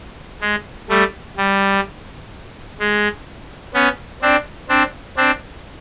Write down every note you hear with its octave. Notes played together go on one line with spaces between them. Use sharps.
G#3
G3 A3
G3
G#3
B3 C#4
C4 D4
C4 D4
C4 D4